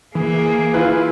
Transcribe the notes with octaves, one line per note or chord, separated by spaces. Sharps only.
E3 A#3 G#4
E3 E4 F4 B4